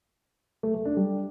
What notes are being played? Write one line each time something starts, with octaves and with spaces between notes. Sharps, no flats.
A3
A3
D4
G3